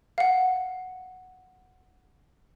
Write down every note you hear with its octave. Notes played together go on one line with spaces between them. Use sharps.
F5 F#5